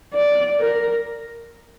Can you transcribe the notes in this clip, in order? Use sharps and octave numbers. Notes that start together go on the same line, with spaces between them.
D5
A#4